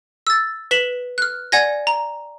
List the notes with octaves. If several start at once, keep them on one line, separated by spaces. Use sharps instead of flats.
E6 A6
B4 B6 E7 F#7
F6 F#6
D5 F#5 G#5 G#6 A#6
A#5